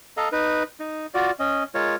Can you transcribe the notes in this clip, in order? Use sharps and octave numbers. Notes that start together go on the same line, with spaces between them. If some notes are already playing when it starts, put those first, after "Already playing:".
A4 D#5 F5 A#5
D#4 B4
D#4
F4 F#4 D5
C#4 D#5
G#3 F4 A#4 C#5